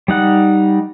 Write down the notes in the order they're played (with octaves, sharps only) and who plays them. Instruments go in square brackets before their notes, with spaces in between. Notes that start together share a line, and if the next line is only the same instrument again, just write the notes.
[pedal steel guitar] G3 D#4 F#5